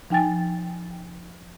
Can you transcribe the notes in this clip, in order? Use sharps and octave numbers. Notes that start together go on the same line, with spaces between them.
F3 D#4 G5 G#5 A6